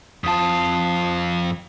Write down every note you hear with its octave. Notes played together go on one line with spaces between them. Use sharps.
F2 F4 A5 D#6